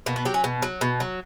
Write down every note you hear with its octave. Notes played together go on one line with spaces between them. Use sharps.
B2 A#3
B3
F#3 G4
C#4
B2
F#3
B2
F#3